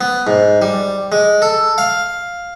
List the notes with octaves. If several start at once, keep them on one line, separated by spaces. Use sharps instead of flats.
B3
G#2
G3
G#3
A4
F5